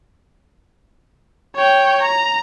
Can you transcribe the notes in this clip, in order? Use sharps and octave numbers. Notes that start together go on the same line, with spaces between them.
C#5 G5
A#5